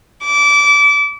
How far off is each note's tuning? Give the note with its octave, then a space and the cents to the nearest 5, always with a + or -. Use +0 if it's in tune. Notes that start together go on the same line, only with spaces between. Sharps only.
D6 -25